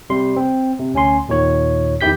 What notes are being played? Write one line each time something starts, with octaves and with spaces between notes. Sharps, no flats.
C3 G3 C6
C4
C3
D2 C#4 G#5 C6
D#2 A#2 D#3 C#5
E2 D#3 E4 G4 G6 B6